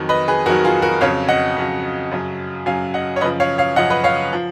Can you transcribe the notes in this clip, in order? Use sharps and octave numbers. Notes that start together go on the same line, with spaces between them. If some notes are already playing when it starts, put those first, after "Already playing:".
Already playing: F2 D#3 F#3
B4 D#5
G#4 B4
F2 D#3 F#3 F#4 A#4
F4 G#4
F#4 A#4
F2 C#3 F#3 C#5 F5
D#5 F#5
F2 C#3 F#3
F#2 C#3 F#3
F#2 C#3 F#3 F5 G#5
D#5 F#5
C#5
F#2 C#3 F3 B4 D#5
C#5 F5
C#5 F5
F#2 C#3 F3 D#5 F#5
B4 D#5
C#5 F5
F3